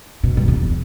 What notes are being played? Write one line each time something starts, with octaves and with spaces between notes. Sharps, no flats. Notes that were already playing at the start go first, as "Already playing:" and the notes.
B2
G2
E2